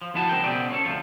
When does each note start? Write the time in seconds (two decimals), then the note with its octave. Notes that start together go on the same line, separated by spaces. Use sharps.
0.02 F3
0.14 F2 F3 E4 F#4 A5
0.29 C#2 C4 A#4 G5
0.44 C#2 B2 C4 G4 G#4 D5
0.70 C4 C#4 A4
0.84 D2 C3 D#3 F3 F4